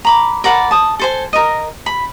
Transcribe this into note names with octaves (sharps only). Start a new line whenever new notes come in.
A#5 B5 D6
A#4 D5 F#5 B5
A5 D#6
A4 C5 G#5
A#4 D#5
B5